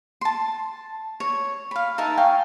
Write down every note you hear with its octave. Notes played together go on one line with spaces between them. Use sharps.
A5 C6
C#5
F5 B5
D#4 A#4 E5 A5
F5 G5 G#5 C#6